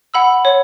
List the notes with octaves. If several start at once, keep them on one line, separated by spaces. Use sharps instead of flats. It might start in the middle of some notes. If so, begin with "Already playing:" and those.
F#5 B5 E6
C#5